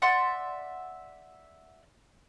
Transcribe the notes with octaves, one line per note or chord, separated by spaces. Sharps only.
D5 E5 F#5 C6